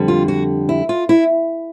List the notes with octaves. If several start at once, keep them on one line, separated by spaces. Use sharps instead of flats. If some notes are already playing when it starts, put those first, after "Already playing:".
Already playing: F2 D3 G3
F4
F#4
E4
F4
E4